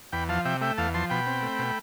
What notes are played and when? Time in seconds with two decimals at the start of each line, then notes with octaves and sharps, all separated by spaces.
0.12 E2 G5 B5
0.29 F3 F5 A5
0.45 C3 E5 G5
0.61 A3 E5 G5
0.78 E2 F5 A5
0.94 F3 A5 C6
1.10 B2 G5 B5
1.27 C4
1.42 A3
1.59 B2